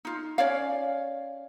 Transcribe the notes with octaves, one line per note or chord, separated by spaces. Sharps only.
D#4 F4
C#4 C#5 D5 F5